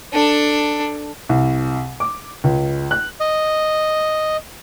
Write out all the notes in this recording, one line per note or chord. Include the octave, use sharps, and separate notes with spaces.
D4 A4
C2
D6
C#2
F#6
D#5